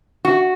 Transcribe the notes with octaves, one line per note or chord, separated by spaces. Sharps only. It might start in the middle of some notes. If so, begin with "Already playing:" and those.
F#4